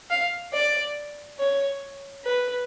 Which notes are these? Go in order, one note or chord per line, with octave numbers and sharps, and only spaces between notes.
F5
D5
C#5
B4